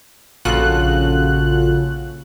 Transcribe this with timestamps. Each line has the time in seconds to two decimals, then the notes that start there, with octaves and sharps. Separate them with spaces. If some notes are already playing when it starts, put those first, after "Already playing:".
0.45 A#1 C#3 F4 F#4 A4 F#6